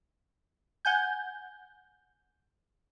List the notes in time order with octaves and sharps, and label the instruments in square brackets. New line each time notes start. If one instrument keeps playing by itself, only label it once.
[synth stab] F#5 G#5 G6